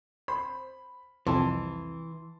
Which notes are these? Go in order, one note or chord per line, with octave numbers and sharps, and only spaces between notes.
C5 B5
C2 F2 E3 A5 C6